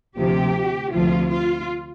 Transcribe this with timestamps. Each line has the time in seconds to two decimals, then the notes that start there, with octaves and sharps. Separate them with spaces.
0.17 D2 C3 F3 G4
0.92 D2 C3 F3 F4
1.30 F4